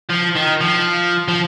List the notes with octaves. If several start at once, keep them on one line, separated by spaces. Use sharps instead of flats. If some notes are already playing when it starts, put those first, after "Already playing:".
F3
D#3
F3
F3